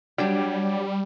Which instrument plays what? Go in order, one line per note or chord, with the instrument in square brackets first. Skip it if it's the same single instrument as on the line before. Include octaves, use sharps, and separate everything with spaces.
[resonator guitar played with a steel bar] F#3 D4 G4 [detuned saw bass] G3